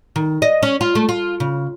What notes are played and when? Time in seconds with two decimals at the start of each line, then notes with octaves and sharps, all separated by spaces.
0.16 D#3
0.42 D#5
0.63 C#4
0.81 F4
0.95 A3
1.09 F4
1.40 C#3